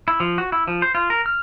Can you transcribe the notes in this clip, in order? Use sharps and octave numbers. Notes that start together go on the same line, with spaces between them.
E4
F3
F#4
E4
F3
C5
F4
A#4
F6